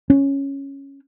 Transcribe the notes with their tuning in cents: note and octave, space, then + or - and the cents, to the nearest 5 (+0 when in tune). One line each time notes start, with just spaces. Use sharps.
C#4 -5